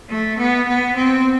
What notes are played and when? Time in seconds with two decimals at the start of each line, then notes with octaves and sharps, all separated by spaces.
0.09 A3
0.38 B3
0.67 B3
0.96 C4